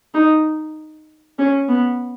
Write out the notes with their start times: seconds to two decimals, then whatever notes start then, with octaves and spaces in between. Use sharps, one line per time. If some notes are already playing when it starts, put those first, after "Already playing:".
0.14 D#4
1.39 C#4
1.69 B3